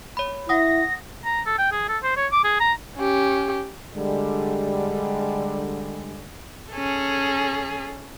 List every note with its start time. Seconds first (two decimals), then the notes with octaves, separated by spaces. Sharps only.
0.17 C#5 B5
0.49 E4 F#5 D#6 A#6
1.25 A#5
1.46 A4
1.58 G5
1.72 G#4
1.89 A4
2.03 C5
2.17 C#5
2.32 D6
2.44 G#4
2.60 A#5
2.97 C#4 G4
3.95 D3 G3 G#3
6.73 C#4 G#4 A4